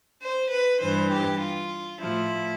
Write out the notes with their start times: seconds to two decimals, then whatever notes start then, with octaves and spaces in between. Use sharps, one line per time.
0.23 C5
0.52 B4
0.82 G2 E3 C5
1.11 G4
1.42 F4
2.00 A2 F3 E4